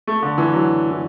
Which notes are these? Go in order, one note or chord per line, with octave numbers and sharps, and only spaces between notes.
A3
D3
E3
F#3
E3